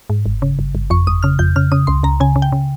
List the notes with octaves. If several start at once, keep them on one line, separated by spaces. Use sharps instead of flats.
G#2
G1
C#3
G1
G1
F2 C#6
G1 D#6
C#3 F6
F2 G6
C#3 F6
C#3 D#6
C#2 C6
C#2 A#5
C#3 G#5
C#3
G5
C#3